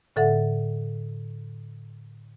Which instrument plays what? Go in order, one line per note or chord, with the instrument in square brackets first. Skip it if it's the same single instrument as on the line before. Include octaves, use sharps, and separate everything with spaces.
[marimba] A2 D3 A4 E5 F#5